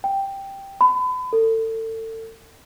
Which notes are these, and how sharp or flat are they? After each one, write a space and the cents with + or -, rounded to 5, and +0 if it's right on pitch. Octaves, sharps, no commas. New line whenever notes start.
G5 +0
B5 +35
A4 +30